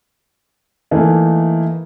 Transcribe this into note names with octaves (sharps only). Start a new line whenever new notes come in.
E3 A3 A#3 D#4